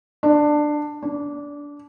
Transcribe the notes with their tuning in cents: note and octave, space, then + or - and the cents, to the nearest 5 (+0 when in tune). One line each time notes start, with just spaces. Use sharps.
D4 +15
D4 -20